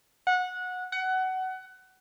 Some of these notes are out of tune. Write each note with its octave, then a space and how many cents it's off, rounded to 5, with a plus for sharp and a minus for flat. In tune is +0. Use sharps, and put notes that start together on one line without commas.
F#5 -20
F#5 +20